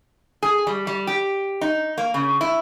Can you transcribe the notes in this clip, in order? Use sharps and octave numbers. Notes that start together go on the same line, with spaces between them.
G#4
G3
G3
G4
D#4
A#3
C#3
E4